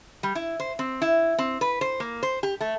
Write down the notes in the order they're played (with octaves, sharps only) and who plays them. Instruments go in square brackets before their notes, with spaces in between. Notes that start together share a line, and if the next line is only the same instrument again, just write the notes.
[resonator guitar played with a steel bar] G3
E4
C5
C4
E4
C4
B4
C5
A#3
C5
G4
A3